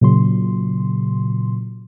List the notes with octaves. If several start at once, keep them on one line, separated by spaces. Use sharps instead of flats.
A#2 C#3 F#3 C6